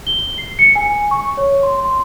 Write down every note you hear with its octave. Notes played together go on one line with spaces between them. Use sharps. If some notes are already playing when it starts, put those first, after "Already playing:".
G7
C7
C#7
G#5
C#6
C#5
C6
C6